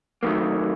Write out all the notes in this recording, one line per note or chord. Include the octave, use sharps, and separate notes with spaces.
D#2 D#3 F#3 A3 A#3